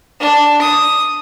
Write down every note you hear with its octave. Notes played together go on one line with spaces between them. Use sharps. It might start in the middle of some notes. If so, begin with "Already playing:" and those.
D4
D#6